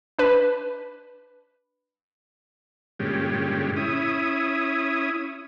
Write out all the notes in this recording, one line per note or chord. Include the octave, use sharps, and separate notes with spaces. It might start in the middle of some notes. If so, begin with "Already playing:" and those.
D4 B4
G2 A#2 D3 G#3 C#4 G4
C#4 E4 D#6